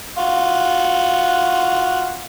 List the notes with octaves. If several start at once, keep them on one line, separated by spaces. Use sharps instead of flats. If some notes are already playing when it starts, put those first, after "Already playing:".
F4 F#4